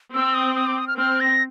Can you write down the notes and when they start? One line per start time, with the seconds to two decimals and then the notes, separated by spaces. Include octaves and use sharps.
0.14 C4 E6
0.34 D#6
0.56 D#6
0.67 D6
0.78 D#6
0.88 F6
0.98 C4 F6
1.20 A#6